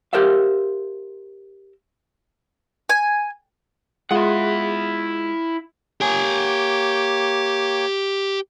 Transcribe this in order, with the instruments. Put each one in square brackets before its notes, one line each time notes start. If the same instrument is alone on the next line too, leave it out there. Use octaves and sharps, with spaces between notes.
[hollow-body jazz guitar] G4 A#4 C5 E5 F5
[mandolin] G#5
[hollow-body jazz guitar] G#3 F4 [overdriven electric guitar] E4 F#5
[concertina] A#3 C#5 G5 [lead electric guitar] G4 G#5